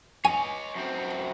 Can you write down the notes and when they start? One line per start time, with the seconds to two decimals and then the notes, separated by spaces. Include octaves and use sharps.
0.25 C#5 D#5 G#5
0.75 F#2 C4